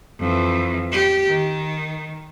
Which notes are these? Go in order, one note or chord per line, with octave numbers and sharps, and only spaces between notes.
F2 E3
G4
D#3